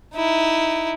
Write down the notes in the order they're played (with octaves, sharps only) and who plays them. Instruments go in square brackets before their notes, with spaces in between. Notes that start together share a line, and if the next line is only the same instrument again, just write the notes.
[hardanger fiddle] D#4 E4